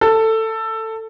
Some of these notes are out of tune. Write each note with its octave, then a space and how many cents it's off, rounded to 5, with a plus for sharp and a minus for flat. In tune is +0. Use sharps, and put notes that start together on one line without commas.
A4 +15